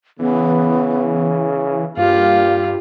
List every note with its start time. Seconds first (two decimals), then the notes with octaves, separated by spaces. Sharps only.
0.19 C#3 E3 B3
1.97 G2 A#2 F4 G4 F5